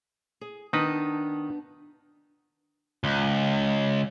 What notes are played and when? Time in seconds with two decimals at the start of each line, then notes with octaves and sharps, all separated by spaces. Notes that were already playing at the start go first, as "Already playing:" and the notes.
0.41 G#4
0.73 D#3 B3 D4 D#4 B4 A5
3.04 C#2